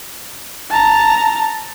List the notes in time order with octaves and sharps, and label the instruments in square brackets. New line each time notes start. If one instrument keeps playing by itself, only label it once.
[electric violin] A5 A#5